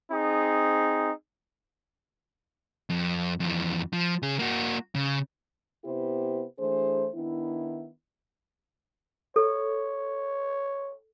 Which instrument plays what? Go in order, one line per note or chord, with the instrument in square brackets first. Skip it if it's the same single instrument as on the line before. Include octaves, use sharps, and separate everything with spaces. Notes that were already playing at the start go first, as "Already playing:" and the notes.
[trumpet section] C4 D#4 G#4
[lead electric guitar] F2
F2 E3
F3
C#3 G#4
A#3 F#4
C#3
[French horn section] C3 B3 E4 G4 B4 C5
E3 A3 D4 G#4 C5
D#3 B3 D4 E4
[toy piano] A4 [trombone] C#5